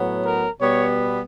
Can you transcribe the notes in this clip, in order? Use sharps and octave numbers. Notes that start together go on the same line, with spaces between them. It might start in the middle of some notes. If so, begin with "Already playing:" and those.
Already playing: A2 F#3 B3
A#4
B2 G3 B3 C#5